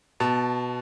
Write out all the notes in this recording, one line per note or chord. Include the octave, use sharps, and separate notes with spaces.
B2 A5